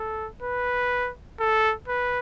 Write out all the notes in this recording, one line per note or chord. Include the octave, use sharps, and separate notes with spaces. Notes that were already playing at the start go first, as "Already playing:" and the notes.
Already playing: A4
B4
A4
B4